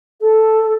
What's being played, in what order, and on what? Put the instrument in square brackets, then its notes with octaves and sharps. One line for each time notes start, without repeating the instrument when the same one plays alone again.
[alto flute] A4